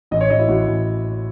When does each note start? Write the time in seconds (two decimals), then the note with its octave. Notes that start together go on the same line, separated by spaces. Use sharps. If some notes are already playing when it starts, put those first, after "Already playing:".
0.11 A1 D#5
0.21 C#5
0.30 A1 D#5
0.39 E4
0.48 A1 F#4
0.67 A1